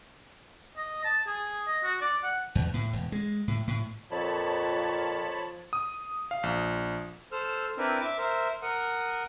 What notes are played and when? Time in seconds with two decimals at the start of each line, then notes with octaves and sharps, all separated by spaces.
0.78 D#5
1.04 A5
1.27 G#4
1.68 D#5
1.84 F#4
2.01 D5
2.24 F#5
2.55 E2
2.74 A2
2.93 E1
3.12 G#3
3.48 A2
3.67 A2
4.11 F2 A#2 F3 C#5 A5 B5
5.73 D#6
6.31 F5
6.43 A#1
7.32 A4 C5 E6 F6
7.78 C4 D4 E4 A#4 B4
8.01 E5 D6
8.18 A#4 C5 E5
8.62 A#4 F#5 D#6